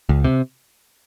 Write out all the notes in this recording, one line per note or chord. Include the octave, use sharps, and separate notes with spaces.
C#2
C3